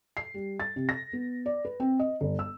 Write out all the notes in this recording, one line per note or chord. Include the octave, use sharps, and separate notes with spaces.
C7
G3
A6
C3
A#6
B3
D5
B4
C4
D#5
G1
E6